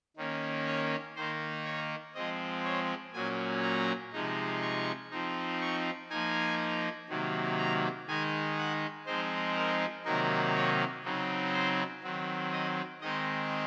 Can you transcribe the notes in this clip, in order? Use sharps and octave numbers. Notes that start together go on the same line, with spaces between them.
D#3 A#3 C#4
C#5
D#3 A#3 D#4 C5
C#5
F3 G#3 C4 D#5
C#5
A#2 F#3 A#3 C#4 G#5
A#5
C3 F3 G#3 D#4
C#6
F3 C4 D#4
C#6
F3 A#3 D#4 G#5
C3 D#3 F#3 A#3
A#5
D#3 G#3 D#4 G#5
F#5
F3 G#3 C4 D#4 C5
A#4
C3 D#3 F#3 A#3 D#4 A#4
C#5
C#3 F#3 C4 D#4
C5
D#3 F#3 C4
D#5
D#3 G#3 C4 D#4 D#5